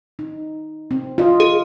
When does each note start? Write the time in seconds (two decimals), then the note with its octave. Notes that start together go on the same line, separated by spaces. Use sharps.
0.19 D#4
0.91 C4
1.18 F4 D#5
1.40 G#4